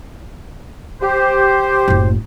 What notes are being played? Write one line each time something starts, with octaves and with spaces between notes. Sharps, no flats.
G4 C5
F#1 A2